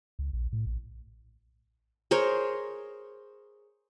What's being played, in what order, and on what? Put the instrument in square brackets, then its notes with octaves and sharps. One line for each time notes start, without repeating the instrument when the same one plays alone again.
[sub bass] C#2
A#1
A2
A#1
[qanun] G#4 A#4 C5 C#5